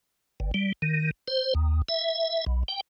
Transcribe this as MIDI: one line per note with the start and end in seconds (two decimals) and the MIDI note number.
0.40 0.51 31
0.54 0.72 55
0.82 1.11 51
1.28 1.54 72
1.55 1.82 39
1.89 2.45 76
2.46 2.63 35
2.68 2.81 79